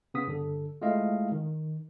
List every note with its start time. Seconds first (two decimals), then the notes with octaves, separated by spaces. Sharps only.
0.14 C#3 B3 D#6 B6
0.27 G2 D3 A4
0.82 G#3 A3 E4 F4 D#5 F5
1.32 D#3